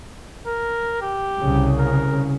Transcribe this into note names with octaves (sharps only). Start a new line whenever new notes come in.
A#4
G4
C2 C#3
A#4